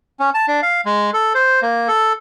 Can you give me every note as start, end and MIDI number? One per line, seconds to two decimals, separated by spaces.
0.20 0.30 61
0.34 0.46 81
0.48 0.61 62
0.63 0.81 77
0.85 1.10 56
1.13 1.33 69
1.35 1.60 72
1.62 1.88 58
1.88 2.13 69